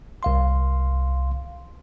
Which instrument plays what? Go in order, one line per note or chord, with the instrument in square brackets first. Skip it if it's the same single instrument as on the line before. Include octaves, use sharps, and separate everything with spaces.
[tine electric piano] C2 F5 C6